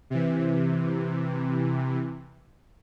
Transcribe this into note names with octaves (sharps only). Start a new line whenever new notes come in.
C3 E3